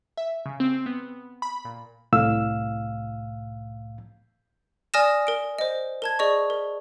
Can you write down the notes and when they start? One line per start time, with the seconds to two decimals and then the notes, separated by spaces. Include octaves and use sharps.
0.17 E5
0.46 C#3
0.60 C4
0.86 B3
1.42 B5
1.65 A#2
2.13 C2 A2 F5 E6
4.94 D5 G#5 D#6 F6 A#6 E7
5.27 A#4 D7
5.59 C5 D#5
6.02 A#4 A5 G#6
6.19 G#4 D5 D#5 C#6
6.50 A#4